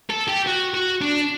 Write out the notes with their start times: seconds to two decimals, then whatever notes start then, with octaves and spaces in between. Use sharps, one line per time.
0.10 A4
0.28 G4
0.46 F#4
0.74 F#4
1.02 D4